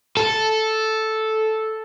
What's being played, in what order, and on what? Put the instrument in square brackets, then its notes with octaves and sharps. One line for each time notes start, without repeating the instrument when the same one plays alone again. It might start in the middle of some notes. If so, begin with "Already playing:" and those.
[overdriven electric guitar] A4